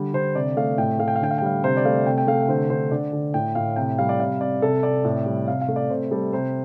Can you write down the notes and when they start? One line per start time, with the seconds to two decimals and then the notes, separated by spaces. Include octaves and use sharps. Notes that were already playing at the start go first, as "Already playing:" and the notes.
Already playing: D3 G3
0.14 D3 C5
0.35 C3 D5
0.57 A3 F5
0.78 A2 G5
0.99 A3 F5
1.08 G5
1.16 F5
1.21 D3 G5
1.31 F5
1.38 G5
1.42 G3 F5
1.63 C3 C5
1.77 D5
1.85 A3 F5
2.06 C3 G5
2.18 G5
2.27 A3 F5
2.49 D3 C5
2.70 D3 C5
2.91 D3 D5
3.13 D3
3.34 A2 G5
3.55 A2 F5
3.76 C3 G5
3.98 G3 F5
4.09 D5
4.20 C3 F5
4.41 C3 D5
4.62 C3 A4
4.83 C3 D5
5.05 A2
5.26 G3
5.47 C3 F5
5.61 F5
5.68 A3
5.76 D5
5.90 C3 C5
6.11 G3 A4
6.33 C3 C5